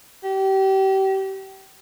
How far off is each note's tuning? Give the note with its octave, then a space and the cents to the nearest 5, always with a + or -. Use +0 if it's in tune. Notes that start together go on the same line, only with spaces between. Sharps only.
G4 -30